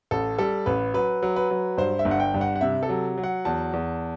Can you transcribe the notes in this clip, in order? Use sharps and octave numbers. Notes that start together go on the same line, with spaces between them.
A1 A4
G3 A4
A1 B4
F#3 B4
F#3
B4
F#3
G2 C5
E5
G1
F#5
G5
G2
F#5
F#5
C3 E5
A4
F#3
F#3
F#5
E2 A5
E2